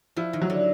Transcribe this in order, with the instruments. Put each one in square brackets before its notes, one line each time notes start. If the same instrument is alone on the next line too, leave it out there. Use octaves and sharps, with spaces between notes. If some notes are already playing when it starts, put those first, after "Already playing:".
[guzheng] F3 [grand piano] E4
[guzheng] D#3
[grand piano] F#3
[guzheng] D3